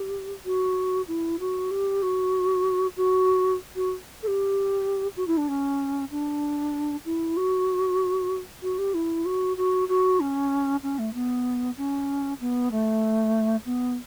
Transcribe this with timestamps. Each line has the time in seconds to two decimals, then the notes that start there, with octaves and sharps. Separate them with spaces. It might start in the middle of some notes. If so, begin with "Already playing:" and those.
Already playing: G4
0.45 F#4
1.08 E4
1.40 F#4
1.71 G4
2.03 F#4
2.97 F#4
3.76 F#4
4.23 A4
4.28 G4
5.17 F#4
5.27 E4
5.37 D4
5.48 C#4
6.11 D4
7.05 E4
7.37 F#4
8.63 F#4
8.78 G4
8.94 E4
9.25 F#4
9.57 F#4
9.89 F#4
10.20 C#4
10.83 C#4
10.99 A3
11.14 B3
11.78 C#4
12.41 B3
12.72 A3
13.66 B3